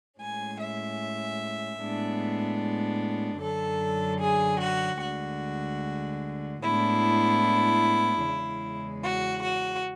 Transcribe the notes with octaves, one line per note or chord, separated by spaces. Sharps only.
A2 G#3 C#4 G#5
E5
A2 G#3 B3 D4
F#2 D3 F#3 A4
G#4
F#4
D2 D3 G#3 F#4
A2 G#3 B3 D4 E4
E2 C#3 G#3
F#4
F#4